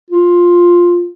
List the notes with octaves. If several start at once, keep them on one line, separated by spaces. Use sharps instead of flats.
F4